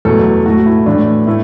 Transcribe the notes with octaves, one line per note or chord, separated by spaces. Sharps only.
E2 B2 F#3 A3 A4
A2 A3 F#4
E4
A2 E3 A3 D4
A2 A3 E4